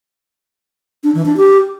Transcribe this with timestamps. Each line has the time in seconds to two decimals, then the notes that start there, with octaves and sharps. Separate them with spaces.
1.04 D4
1.15 E3
1.26 D4
1.37 G4